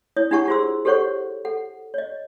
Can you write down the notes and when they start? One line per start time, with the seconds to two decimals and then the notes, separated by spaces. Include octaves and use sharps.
0.17 E4 C#5 D#6
0.31 D4 E4 G4 F#5 A5 C#6
0.48 F4 G#4 C5 C6 E6
0.85 G4 A4 C5 C#5 F#5 C#6
1.45 A4 F#5
1.94 C#5 D#5